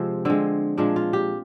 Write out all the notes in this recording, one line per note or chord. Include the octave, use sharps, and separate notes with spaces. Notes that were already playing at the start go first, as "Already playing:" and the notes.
Already playing: C3 F3 G#3 C4
D3 G#3 C4
A#2 F3 G#3 D4
F4
G4